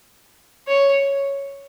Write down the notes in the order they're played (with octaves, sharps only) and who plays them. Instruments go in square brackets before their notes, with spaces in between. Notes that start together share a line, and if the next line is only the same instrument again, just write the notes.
[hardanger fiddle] C#5